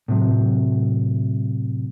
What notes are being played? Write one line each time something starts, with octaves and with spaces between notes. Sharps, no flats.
A2 C3 F#3